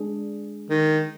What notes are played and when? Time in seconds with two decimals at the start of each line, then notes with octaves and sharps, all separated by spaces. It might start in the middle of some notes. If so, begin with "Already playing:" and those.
Already playing: G#3 D4 G#4
0.70 D#3